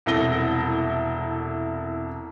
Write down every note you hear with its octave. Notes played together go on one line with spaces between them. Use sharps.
E1 C2 E4 A4 A#6 G7